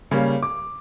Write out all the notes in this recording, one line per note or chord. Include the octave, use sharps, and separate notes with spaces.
C#3 G3 A#3
D6